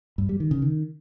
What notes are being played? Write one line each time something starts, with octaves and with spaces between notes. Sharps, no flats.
G2
G3
D#3
C#3
D#3